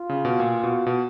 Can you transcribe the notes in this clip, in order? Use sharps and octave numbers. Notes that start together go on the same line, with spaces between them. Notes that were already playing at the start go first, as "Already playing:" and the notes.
Already playing: F4
C#3
B2
A#2
B2
B2